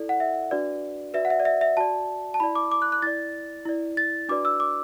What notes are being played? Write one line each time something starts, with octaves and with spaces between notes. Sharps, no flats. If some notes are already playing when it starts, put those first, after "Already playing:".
Already playing: E4 A4 D5
F#5
E5
D4 F#4 B4 D5
F#4 B4 D5 E5
F#5
E5
D5
E5
E5
F#4 D5 A5
A5
E4 D5 B5
D6
D6
F#6
F#6
E4 D5 A6
E4 D5
A6
D4 F#4 B4 D5 D6
E6
D6